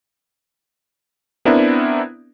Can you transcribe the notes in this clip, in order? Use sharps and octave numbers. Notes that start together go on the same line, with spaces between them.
B3 C4 D4 E4 A#4